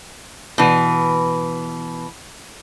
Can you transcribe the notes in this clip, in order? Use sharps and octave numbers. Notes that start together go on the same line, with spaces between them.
B2 E3